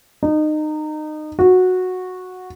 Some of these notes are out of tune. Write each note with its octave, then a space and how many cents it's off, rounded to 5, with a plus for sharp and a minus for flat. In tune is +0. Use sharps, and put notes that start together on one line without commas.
D#4 -25
F#4 -10